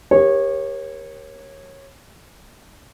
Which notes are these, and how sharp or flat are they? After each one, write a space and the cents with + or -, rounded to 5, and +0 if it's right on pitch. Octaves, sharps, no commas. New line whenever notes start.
G4 +10 A#4 +25 C#5 -20